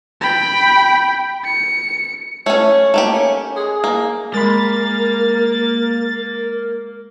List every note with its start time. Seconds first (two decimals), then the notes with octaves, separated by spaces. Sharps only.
0.21 G5 B5
1.45 C#7
2.46 A3 C#4 C#5
2.94 A3 A#3 G4
3.13 C#4
3.56 G#4
3.84 A#3
4.34 G#3 A#3 A#4 B5 A6